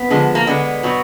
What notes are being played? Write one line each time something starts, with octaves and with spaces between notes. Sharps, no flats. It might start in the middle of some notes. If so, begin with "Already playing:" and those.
Already playing: B3
D3 F3 G#3
A#3
D3 G#3 B3
B2 F#3